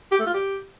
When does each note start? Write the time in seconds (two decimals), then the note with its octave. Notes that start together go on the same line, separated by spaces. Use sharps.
0.11 G4
0.19 A3
0.26 F4
0.34 G4